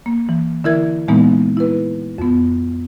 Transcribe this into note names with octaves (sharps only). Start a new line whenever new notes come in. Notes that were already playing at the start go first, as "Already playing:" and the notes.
A#3
E3
D3 E3 E4 A#4 E5 G#6
A#2 E3 G#3 A#3 B3 D#4
E4 B4
F2 B3